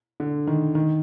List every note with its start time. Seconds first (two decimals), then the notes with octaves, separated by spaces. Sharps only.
0.20 D3
0.47 D#3
0.75 D#3